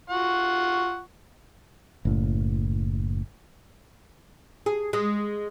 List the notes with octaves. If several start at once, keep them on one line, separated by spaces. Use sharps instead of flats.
F4 F#5 C#6
F#1 A2
G#4
G#3